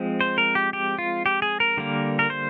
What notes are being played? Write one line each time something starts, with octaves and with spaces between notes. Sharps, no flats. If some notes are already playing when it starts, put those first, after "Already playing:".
Already playing: F3 G#3 C4
C5
A#4
G4
G4
F4
G4
G#4
A#4
D3 G3 A#3
A#4
C5